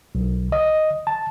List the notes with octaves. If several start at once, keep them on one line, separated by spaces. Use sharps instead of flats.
B1
D#5
A5